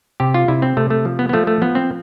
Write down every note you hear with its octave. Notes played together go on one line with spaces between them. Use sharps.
C3 G4
F4
C3 E4
C4
C3 A3
A3
F3
B3
B3
F3 A3
A3
F3 B3
C4